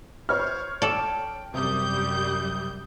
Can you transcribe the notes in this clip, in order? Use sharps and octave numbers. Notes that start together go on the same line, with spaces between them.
C5 C#5 F6
A4 D5 G5
F#2 C3 G3 D#6 G6